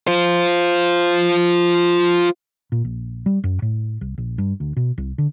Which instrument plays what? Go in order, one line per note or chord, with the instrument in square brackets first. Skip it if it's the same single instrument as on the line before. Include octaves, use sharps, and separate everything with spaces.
[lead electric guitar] F4 C5
[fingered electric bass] A#2
A#1
G3
F#2
A2
C2
A#1
G2
D2
B2
C2
D3